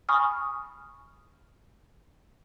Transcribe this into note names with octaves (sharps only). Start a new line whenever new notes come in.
G#5 B5 C#6 D#6 F6